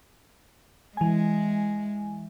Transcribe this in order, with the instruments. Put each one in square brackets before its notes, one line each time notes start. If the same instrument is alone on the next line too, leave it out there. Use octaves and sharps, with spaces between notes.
[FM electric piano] E3 G#5 [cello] G#3